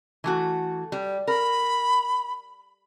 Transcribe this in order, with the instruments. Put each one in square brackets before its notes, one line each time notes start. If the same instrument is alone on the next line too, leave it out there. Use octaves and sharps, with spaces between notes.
[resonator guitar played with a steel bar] E3 A3 F#4
G3
[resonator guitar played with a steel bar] A#4 [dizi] B5